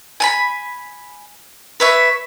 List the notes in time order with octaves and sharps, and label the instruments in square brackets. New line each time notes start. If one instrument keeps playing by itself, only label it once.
[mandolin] G#5 A5 B5
B4 C#5 E5